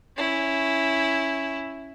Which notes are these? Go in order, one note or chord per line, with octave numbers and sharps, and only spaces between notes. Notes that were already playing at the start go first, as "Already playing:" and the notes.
C#4 E4